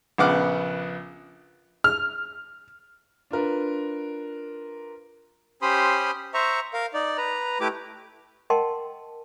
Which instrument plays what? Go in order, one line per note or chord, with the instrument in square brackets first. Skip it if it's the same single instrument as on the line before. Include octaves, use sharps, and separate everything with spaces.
[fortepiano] A#1 C#3 B3 F#5 D6 F6
[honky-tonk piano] F6
[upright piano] D4 F4 A#4 B4
[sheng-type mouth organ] C#4 G4 C5 B5 C6 D#6
C5 E5 A#5 C#6
A#4 F5
D#4 D5
B4 A#5
A3 E4 G4 B4 D6
[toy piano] A#4 D#5 F#5 G5 A5 C6